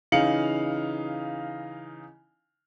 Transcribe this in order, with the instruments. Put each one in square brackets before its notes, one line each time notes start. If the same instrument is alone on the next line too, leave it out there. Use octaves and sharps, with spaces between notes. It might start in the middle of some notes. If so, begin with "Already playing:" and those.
[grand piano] C#3 E3 D#4 F5 C#7 F#7